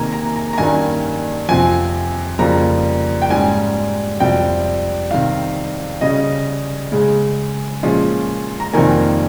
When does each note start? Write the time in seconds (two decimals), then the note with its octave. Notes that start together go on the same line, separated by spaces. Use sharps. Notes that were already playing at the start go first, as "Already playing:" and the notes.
Already playing: C3 D#3 A#3 G#5 A#5
0.12 A#5
0.36 A#5
0.53 A#5
0.58 G2 D#3 G3 A#3 C#4 G#5
1.48 F2 C3 F3 C4 G#5
2.39 F2 C#3 G3 A#3 A#5
3.22 G5
3.30 G#2 G3 C#4 G#5
4.20 F2 C3 G3 G5
5.11 C3 D#3 G3 F5
6.01 C#3 G3 C#4 D#5
6.92 C#3 G#3 C#4
7.83 A#2 F3 G#3 C#4
8.60 A#5
8.73 F2 C3 D#3 G3 A#3 G#5